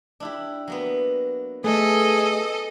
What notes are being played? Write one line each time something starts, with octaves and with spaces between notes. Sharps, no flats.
D4 E4 G4
F#3 A#3 B3
A3 G#4 A4 B4 D#5